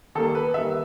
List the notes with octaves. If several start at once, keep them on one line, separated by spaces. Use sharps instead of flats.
D#3 G3 A#3 A4
B4
D#3 G3 A#3 E5